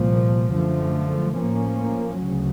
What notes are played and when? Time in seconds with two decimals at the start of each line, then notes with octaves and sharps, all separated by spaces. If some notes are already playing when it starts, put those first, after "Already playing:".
Already playing: C2 A#2 F3
0.52 F#2 D3 F3 A3
1.36 A2 F3 A#3 C#4
2.18 D2 C#3 F#3